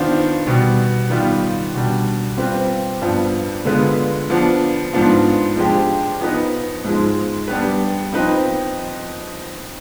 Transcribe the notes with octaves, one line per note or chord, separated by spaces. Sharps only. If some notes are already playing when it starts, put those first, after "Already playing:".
Already playing: D#3 B3 D4 F4 C5
B2 G3 B3
D#3 G3 B3 F4 B4
B2 G3 D4
G3 C4 F4 B4
G2 F3 B3
D3 G#3 B3 F4 B4
F3 B3 D4
G#2 F3 B3 D4 F4
F3 G#3 D4 G4
F3 B3 D#4 B4
G#2 F3 G#3
G3 B3 D4 G4 B4
F3 C4 D#4 B4